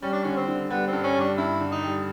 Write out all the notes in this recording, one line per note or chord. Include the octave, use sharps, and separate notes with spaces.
G3 C#4
D4
D3 C#4
C4
D3
G3 B3
C4
G2
C#4
G3 D4
G2 E4
D3
D#4
G3